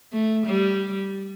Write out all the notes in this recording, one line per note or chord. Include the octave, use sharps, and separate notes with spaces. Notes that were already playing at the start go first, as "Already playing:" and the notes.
A3
G3